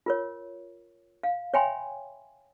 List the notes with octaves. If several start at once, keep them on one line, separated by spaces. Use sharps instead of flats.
F4 A#4 C#5
F5
C#5 E5 G5 G#5 B5 C6